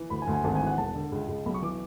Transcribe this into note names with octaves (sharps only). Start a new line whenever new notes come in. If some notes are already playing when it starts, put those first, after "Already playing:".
Already playing: E3
D2 B5
G#5
D2
G#5
G#1 A5
G#5
E3
F#5
E1 A5
D3
C#2
C#2
B1 B5
C#6
E3 D6